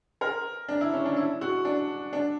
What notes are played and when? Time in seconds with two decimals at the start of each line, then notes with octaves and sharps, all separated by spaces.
0.21 A#4
0.68 D4
0.81 E4
0.93 C#4
1.05 D4
1.16 E4
1.41 F#4
1.65 D4
2.13 D4